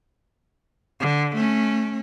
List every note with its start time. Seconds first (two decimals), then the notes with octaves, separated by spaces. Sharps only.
1.00 D3
1.35 A3 C#4